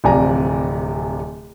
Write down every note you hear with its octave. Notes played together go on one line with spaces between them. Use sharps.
D1 C3 F3 D5 G#5 A#5